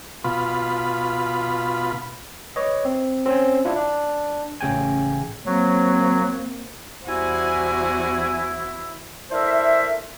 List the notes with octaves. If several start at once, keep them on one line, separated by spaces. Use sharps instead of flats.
B2 F4 B5
B4 C#5 D#5
C4
C4 C#4 C5 G#5
D4 E4 F4
D4
A1 C#3 G5 G#5
F#3 A#3 C4
E2 G3 E4 F#4 C5 F#5 G#5
D4 E4 A4 A#4 C5 E5